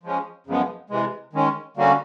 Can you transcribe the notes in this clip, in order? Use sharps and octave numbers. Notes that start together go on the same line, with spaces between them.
F3 G#3 C#4
F#2 C#3 F3 G#3 B3
C3 E3 G#3
D#3 G#3 C#4
D3 G3 A#3 C#4 F#4